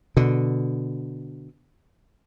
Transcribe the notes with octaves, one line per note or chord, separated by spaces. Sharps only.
B2 D3